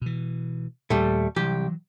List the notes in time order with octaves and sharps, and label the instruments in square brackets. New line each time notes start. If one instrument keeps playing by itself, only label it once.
[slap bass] B2 E3
[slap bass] D#2 A#2 [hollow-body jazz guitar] G3 A3
[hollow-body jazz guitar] C2 G4 [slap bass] E3 F#3